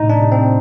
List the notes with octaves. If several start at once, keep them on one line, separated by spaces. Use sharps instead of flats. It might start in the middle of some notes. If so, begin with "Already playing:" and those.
Already playing: A2 C3 D#4
D4
C3
C4